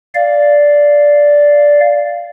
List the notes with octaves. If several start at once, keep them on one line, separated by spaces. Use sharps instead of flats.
D5 F5